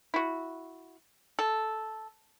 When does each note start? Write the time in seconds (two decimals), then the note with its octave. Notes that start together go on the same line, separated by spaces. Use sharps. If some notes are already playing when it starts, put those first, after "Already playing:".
0.14 E4 F#4
1.39 A4